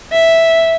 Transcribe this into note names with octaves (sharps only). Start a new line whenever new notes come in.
E5